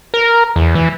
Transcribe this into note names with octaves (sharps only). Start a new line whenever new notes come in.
A#4
E2
E3